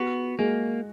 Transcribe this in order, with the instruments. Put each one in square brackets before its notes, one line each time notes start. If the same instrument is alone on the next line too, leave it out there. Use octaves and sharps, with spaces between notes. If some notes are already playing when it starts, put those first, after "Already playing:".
Already playing: [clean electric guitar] B3 [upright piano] F#4
[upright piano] G#3 [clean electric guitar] A#3